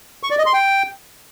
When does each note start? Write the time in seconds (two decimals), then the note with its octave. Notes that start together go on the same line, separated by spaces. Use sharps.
0.23 C#6
0.31 D5
0.38 D#5
0.46 C6
0.53 G5